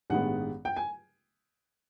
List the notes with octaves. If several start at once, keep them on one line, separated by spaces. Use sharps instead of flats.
A1 G2 D#3 G#3 B3 F#5
G5
G#5